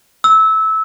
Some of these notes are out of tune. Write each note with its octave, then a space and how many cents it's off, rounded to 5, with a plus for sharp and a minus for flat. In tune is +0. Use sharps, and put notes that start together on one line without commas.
E6 -20